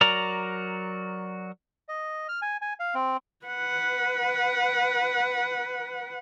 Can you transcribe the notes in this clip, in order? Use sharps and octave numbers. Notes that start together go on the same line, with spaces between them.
F#3 F#4 A#4 D5 A#5
D#5
F6
G#5
G#5
F5
C4
B4 F#5